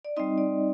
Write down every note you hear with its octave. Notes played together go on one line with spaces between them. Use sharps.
D5
G3 C4 D#4 D#5
D5